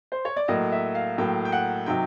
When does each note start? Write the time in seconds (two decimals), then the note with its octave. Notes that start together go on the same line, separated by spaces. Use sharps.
0.12 C5
0.25 C#5
0.36 D5
0.48 A2 F#3 A#3 D#5
0.72 E5
0.95 F5
1.18 A2 F#3 A#3 G5
1.45 G5
1.52 F#5
1.86 C3 D#3 F#3 G5